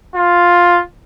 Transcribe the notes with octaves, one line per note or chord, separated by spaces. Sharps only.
F4